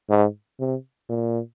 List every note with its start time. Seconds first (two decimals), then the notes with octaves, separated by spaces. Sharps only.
0.10 G#2
0.60 C3
1.09 A#2